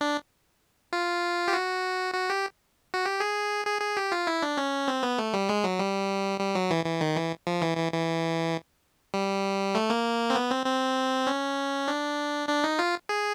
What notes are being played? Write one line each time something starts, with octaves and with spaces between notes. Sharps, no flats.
D4
F4
G4
F#4
F#4
G4
F#4
G4
G#4
G#4
G#4
G4
F4
E4
D4
C#4
C4
B3
A3
G3
G#3
F#3
G3
G3
F#3
E3
E3
D#3
E3
F3
E3
E3
E3
G3
A3
A#3
C4
B3
C4
C4
C#4
D4
D4
D#4
F4
G#4